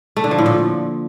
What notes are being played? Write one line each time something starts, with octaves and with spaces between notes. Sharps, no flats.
A3
D3
F3
A2
A#2